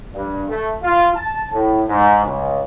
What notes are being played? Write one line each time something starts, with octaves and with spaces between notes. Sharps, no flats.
G2
A3
F4
A5
A2
G#2
C#2